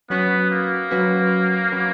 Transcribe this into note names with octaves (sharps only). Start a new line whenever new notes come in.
F#3 B3 C#4 F#4 B4
A#3
F#3 C#4 F#4 B4
F#3 C#4 F#4 B4